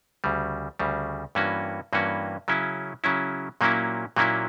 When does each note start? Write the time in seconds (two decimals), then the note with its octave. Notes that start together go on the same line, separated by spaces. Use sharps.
0.24 D2 C#3 G3
0.79 D2 C#3 G3
1.35 G2 E3 A#3 C#4 F#4
1.93 G2 E3 A#3 C#4 F#4
2.48 C#3 F#3 C#4 E4
3.04 C#3 F#3 C#4 E4
3.61 A#2 F#3 A#3 C#4 E4
4.16 A#2 F#3 A#3 C#4 E4